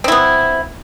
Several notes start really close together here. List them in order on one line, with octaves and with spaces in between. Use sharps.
C4 E4 B3